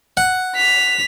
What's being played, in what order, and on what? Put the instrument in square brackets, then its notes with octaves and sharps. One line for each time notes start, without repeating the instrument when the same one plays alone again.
[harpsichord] F#5
[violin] B6 F7